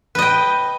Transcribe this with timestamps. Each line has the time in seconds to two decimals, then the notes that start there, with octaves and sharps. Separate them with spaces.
0.15 B4
0.19 D#5
0.22 G5